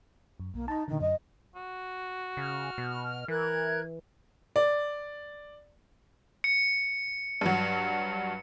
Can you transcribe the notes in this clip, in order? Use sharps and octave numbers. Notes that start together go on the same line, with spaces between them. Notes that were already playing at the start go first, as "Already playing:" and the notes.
F#2
B1 A#3
D#4 A5 A#5
A#2 D3 D#3
F#2 D#5
F#4
C#3 F6
B2
E3 A#4 F#6 G#6
D5
C#7
G2 F#3